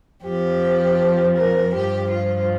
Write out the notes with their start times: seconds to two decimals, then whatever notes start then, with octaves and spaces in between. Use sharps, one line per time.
0.24 F2 F3 G4
1.36 A#4
1.73 G2 F3 G4
2.10 F4